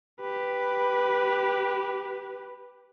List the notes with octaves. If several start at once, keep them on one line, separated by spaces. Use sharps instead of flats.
G4 B4